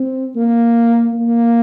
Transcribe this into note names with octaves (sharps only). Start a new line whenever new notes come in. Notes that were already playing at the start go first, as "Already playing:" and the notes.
Already playing: C4
A#3
A#3